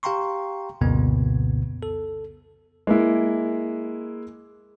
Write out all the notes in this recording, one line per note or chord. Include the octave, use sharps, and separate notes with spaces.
G4 F5 G5 A#5 C6 C#6
C2 F2 A#2 C#3 B3
A4
G#3 A#3 E4